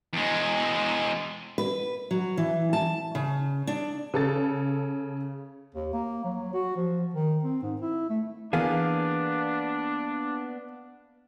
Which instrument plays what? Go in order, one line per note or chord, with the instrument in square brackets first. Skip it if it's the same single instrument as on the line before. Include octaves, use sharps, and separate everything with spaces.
[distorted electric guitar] E2 G#3
[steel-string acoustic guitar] B4
F#3
E3
A5
C#3
D4
[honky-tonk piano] C#3 A4 A6
[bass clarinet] D#2
A#3
F#3
F#4
F3
D#3
C4
G#2
E4
A3
[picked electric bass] E3 [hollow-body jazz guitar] A#3 B3 G#4 [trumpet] D4 [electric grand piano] F5